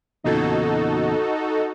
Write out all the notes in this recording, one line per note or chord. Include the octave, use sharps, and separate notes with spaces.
E2 A#2 C#3 D#4 F#4 A4